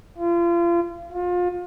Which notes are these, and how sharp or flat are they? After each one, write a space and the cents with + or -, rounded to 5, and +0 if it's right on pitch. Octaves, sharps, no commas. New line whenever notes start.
F4 -35
F4 +30